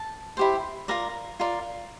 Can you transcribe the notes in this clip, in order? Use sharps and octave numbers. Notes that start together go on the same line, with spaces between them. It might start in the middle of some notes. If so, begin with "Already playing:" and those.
Already playing: A5
E4 G4 C5
F4 A#4 D5 A#5
F4 A#4 D5